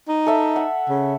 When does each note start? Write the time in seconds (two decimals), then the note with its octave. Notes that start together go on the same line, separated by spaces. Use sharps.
0.08 D#4
0.26 A4 E5
0.56 F#5
0.89 C#3